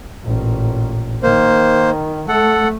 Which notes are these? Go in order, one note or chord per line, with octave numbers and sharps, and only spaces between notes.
A1 A#2
D#3 A#3 C5
A3 A4 F#5